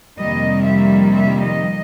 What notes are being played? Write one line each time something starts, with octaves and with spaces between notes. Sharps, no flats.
F2 C3 D#3 G3 A#3 D#5
E5
E5
D#5